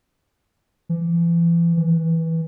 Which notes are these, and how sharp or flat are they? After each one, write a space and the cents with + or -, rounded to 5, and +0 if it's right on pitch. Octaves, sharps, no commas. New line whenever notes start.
E3 +40
E3 -15